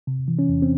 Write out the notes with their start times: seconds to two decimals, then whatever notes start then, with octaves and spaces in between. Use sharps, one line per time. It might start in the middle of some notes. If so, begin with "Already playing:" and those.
0.07 C3
0.28 E3
0.39 C#4
0.49 E2
0.62 C4